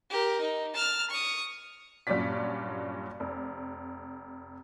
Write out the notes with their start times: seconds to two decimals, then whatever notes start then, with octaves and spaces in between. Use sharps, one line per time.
0.10 G4 A#4
0.41 D#4
0.74 A5 F6
1.10 C#6 D#6
2.07 G2 A#2 F#3 C#4 D5 B6
3.20 F1